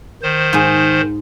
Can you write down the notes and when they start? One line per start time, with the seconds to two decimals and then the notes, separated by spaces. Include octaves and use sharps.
0.23 D#3 C5
0.53 G#2 G#4